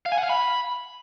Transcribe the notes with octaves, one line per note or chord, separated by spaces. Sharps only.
F5
G#5
F#5
F5
B5